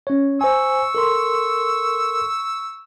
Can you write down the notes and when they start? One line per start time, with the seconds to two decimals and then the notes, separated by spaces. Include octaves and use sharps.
0.07 C#4 C#5
0.41 C5 G#5 C#6 E6
0.95 A4 A#4 C6